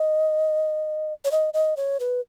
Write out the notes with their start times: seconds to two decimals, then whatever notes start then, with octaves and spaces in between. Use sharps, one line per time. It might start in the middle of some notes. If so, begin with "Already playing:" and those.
Already playing: D#5
1.25 C#5
1.31 D#5
1.54 D#5
1.77 C#5
2.00 B4